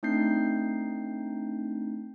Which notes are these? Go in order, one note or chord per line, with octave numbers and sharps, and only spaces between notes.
A3 C4 D4 D#4 G6 C7